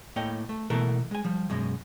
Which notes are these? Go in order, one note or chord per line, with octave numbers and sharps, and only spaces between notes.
A2 A#3 A4 C#5 D#5 G5
A3
B2 E3 A3 A#3 A4 A#4
G#3 G#5
F3 G3
F#2 B2 G#3